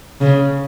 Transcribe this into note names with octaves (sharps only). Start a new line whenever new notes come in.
C#3